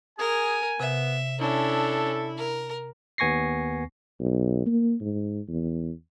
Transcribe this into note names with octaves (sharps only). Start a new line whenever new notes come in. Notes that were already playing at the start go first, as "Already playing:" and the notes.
G#4 A#4 G#5
C3 B3 E5
C#4 D4 E4 A4
A#4
D#2 B3 G#5 C#6 A#6 C7
B1
A#3
G#2
E2